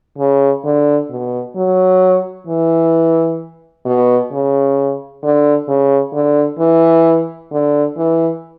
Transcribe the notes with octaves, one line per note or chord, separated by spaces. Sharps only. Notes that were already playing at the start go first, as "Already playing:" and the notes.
C#3
D3
B2
F#3
E3
B2
C#3
D3
C#3
D3
E3
D3
E3